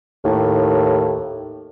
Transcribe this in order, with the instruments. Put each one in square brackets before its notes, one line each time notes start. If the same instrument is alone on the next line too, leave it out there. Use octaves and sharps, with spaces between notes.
[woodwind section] D#2 A2